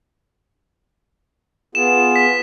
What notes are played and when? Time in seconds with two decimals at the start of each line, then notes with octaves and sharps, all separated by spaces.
1.75 B3 F4 G#4 E7
2.16 B6